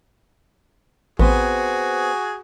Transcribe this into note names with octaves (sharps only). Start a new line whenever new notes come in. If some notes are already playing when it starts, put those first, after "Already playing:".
A1 B3 C4 F#4 G#4 C5